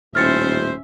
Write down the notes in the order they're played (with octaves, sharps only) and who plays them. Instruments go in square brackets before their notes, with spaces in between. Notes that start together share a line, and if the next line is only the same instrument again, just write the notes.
[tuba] D#1 [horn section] A2 C5 [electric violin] C#4 E5 [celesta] F6 A6 C#7